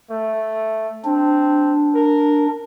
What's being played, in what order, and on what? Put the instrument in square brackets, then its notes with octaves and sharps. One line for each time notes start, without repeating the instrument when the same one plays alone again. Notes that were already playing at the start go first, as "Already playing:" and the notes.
[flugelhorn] A3
[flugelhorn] C4 [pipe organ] D4
[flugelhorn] A#4